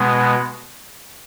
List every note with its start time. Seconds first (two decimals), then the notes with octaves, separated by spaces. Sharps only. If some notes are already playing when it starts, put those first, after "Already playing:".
Already playing: B2 G#3 B3